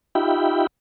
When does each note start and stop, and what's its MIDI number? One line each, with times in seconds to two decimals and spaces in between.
0.15 0.67 63
0.15 0.67 65
0.15 0.67 67
0.15 0.67 76
0.15 0.67 79
0.15 0.67 83